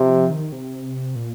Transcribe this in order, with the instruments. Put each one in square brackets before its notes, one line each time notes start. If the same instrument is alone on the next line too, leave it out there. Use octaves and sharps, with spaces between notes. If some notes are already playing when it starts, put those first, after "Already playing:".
Already playing: [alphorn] C3 [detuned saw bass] F3
[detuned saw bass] D#3
C3
A#2